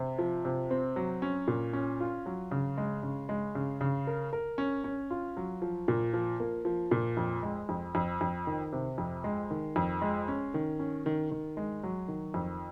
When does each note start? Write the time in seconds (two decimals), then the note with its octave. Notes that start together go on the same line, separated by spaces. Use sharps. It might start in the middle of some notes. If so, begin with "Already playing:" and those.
Already playing: C3
0.18 F3
0.45 C3
0.71 C4
0.96 F#3
1.22 C#4
1.48 A#2
1.73 C#4
2.00 F4
2.26 F#3
2.51 C#3
2.78 G#3
3.03 C#3
3.29 G#3
3.55 C#3
3.81 C#3
4.07 A#4
4.33 A#4
4.58 C#4
4.84 C#4
5.10 F4
5.37 F#3
5.62 F3
5.88 A#2
6.13 F3
6.40 A#3
6.65 F3
6.91 A#2
7.17 F2
7.43 G#3
7.69 F2
7.95 F2
8.21 F2
8.47 D#3
8.72 C3
8.98 F2
9.24 G#3
9.50 D#3
9.76 F2
10.02 G#3
10.28 C#4
10.54 D#3
10.79 C#4
11.06 D#3
11.31 D#3
11.57 G#3
11.83 F#3
12.08 D#3
12.34 F2